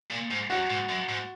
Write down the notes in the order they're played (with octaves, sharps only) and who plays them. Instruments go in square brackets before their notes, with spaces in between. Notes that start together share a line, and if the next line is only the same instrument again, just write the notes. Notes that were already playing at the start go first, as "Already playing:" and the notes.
[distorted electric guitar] A#2
G#2
[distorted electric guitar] F#2 [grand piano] F#4
[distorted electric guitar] G#2
F#2
G#2